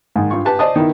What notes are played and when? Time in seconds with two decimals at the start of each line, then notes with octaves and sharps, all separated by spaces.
0.16 G#2 D#3
0.31 G2 F4 C#6
0.45 G4 B4 A5
0.59 C5 D5 D#5 A5 D#6
0.76 D#3 B3 D#4 E4